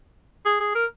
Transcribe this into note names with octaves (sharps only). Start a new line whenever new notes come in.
G#4
G#4
A#4